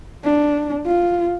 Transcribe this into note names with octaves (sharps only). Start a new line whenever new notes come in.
D4
F4